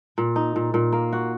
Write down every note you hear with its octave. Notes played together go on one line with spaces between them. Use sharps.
A#2
D#4
A#2
A#2
A#3
F#4